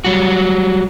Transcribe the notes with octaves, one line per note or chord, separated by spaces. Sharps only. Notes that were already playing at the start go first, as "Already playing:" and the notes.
F#3 G3 F#4